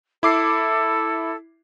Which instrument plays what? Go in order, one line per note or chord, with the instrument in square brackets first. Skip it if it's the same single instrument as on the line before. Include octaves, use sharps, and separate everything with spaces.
[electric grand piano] E4 D6 C7 [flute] A4